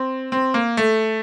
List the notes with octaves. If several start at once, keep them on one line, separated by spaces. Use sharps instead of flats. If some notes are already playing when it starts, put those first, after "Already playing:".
Already playing: C4
C4
A#3
A3